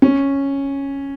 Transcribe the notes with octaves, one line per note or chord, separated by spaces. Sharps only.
C#4